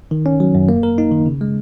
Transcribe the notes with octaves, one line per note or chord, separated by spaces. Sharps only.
D#3
C#4
F#3
F#2
A#3
A#4
D#4
D#3
C#3
G#3